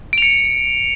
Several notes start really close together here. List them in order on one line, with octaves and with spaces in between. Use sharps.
D7 F7 C#7